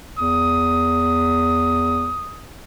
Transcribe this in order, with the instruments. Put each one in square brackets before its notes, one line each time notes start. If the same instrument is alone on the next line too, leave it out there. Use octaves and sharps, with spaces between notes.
[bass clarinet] E2 [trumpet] D#6